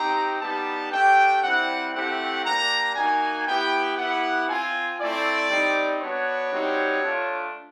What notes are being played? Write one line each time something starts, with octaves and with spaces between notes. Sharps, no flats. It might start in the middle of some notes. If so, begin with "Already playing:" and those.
Already playing: C4 D#4 G4 A#5
G3 B3 D#4 G4 A5
A3 D4 G4 G5
G3 C4 E4 F#5
A3 C4 E4 G4 F#5
G3 A#3 D4 A#5
A#3 D#4 F#4 G#5
B3 E4 G4 G5
B3 E4 G4 F#5
C4 F4 G#5
A3 C4 E4 D5
G3 C4 D#4
B3 D4 F#4 C#5
G3 C4 D#4 F#4
A3 D4 F4